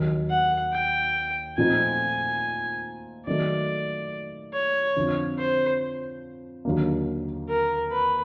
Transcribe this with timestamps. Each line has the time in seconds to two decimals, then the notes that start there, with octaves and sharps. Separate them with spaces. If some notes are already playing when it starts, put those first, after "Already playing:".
Already playing: D#2 D#3 F#3
0.30 F#5
0.73 G5
1.58 A#2 F3 A3 C4 D#4 G#5
3.27 D#3 F#3 A3 D5
4.53 C#5
4.96 F2 D3 F3
5.38 C5
6.65 D#2 D3 F#3 A#3
7.49 A#4
7.91 B4